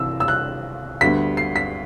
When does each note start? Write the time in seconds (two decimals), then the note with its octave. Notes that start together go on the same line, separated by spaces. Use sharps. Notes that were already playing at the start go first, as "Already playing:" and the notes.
Already playing: C2 C3 E3 E6
0.20 E6
0.28 F#6
1.01 D2 D3 G3 B3 B6
1.37 C7
1.56 B6